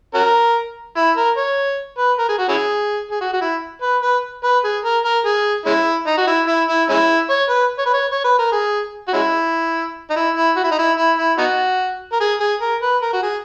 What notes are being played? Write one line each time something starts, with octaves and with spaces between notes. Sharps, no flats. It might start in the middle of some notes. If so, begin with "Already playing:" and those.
C#4 F#4 A#4
E4
A#4
C#5
B4
A#4
G#4
F#4
C#4 E4 G#4
G#4
F#4
F#4
E4
B4
B4
B4
G#4
A#4
A#4
G#4
G#3 C#4 E4
D#4
F#4
E4
E4
E4
G#3 C#4 E4
C#5
B4
C#5
B4
C#5
C#5
B4
A#4
G#4
F#4
G#3 C#4 E4
D#4
E4
E4
F#4
E4
D#4
E4
E4
E4
B3 D#4 F#4
A#4
G#4
G#4
A#4
B4
A#4
F#4
G#4